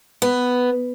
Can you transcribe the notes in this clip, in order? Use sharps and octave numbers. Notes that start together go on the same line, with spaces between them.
B3